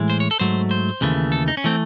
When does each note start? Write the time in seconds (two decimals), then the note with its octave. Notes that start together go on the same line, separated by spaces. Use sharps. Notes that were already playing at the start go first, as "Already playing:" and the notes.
Already playing: A2 E3 G#3
0.10 C5
0.20 C#5
0.31 A4
0.40 G#2 F#3 A3 C5
0.71 C5
1.01 D#2 C#3 E3 A3
1.32 A4
1.48 D#4
1.57 C#4
1.64 E3 A3 C4